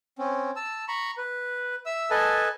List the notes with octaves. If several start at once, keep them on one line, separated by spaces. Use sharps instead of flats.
C4 C#4
A5 E6
A#5 B5 C#6
B4
E5 E6
A4 B4 D#5 G#5 A5